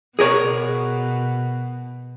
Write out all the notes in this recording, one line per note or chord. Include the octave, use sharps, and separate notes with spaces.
B2 G#4 A#4 C#5